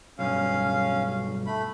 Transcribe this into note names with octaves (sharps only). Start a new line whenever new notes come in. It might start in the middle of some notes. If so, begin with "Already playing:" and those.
B1 G2 C#4 F5
A3 B5